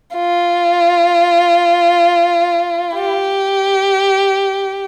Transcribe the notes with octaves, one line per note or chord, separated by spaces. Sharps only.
F4
G4